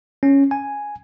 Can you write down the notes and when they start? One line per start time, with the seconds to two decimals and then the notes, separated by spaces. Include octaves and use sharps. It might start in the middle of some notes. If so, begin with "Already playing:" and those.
0.23 C#4
0.51 G#5